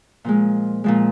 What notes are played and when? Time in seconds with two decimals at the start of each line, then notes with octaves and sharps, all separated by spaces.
0.24 A#2 F3 G#3
0.84 A#2 F3 G#3